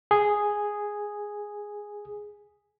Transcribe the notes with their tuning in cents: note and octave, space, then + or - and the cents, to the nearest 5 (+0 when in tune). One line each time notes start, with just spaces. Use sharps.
G#4 -5